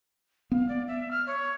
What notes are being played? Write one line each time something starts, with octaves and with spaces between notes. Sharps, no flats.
B3 F5
D5
E5
F6
C#5